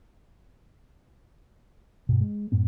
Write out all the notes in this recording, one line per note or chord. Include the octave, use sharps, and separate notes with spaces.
G2 B2
G#3
F#2 A2 C4